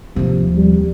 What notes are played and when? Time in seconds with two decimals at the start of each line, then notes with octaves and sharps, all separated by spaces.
0.16 D#2 C3 F3
0.57 G3